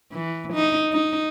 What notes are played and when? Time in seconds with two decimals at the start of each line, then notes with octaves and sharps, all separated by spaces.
0.13 E3
0.54 D#4
0.92 D#4